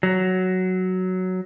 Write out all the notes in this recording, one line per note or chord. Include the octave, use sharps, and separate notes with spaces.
F#3